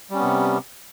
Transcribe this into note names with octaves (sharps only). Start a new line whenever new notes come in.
C3 G3 B3 C#4